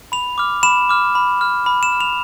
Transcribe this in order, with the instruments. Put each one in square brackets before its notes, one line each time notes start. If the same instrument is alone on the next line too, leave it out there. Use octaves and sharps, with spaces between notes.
[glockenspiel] B5 F7
D6 F6
B5 E7
D6 F6
B5
F6
B5
E7
F6
F7